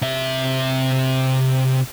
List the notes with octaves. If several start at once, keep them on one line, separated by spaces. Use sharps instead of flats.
C3 E5